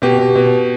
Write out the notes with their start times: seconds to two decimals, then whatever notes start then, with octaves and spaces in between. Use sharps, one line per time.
0.02 B2 G4
0.19 B2
0.35 B2